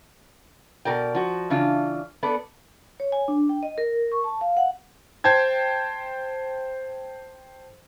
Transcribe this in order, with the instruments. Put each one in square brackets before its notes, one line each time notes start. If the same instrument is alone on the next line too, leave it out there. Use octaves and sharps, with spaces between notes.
[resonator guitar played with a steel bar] B2 A#4 D5 G5
F3 F#4
C#3 E3 D4 F4
B3 A4 D5
[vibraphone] C#5
G#5
D4
G5
D#5
A#4
C#6
A5
F5
F#5
[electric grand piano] C5 G5 A5 G#6